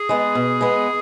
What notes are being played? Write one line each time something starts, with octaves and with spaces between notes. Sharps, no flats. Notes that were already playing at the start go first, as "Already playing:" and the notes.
Already playing: G#4
G#3 B3
B2
G#3 B3